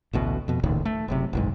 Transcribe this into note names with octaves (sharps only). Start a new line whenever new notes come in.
A1 D2 B2
F2 B2
D#1 C#2 A2 D#3
A3
F#1 F#2 C3
F#1 B1 G#2